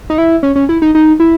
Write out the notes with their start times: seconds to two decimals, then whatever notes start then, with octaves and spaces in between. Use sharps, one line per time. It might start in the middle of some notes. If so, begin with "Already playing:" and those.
0.10 D#4
0.18 E4
0.43 C#4
0.56 C#4
0.69 E4
0.82 D#4
0.95 D#4
1.20 E4